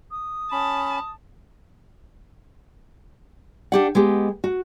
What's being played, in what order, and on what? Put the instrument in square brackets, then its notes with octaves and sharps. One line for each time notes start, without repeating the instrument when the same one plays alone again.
[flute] D#6
[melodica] C#4 B5 [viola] A5
[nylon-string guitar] D4 G4 F#5
G#3 B3 G4
F#4